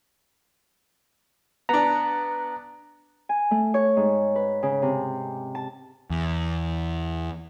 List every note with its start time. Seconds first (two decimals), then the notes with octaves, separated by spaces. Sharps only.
1.69 B3 D4 A#5
3.29 G#5
3.51 A3
3.74 C#5
3.97 G#2
4.36 B4
4.63 C#3
4.82 C3
5.55 A5
6.10 E2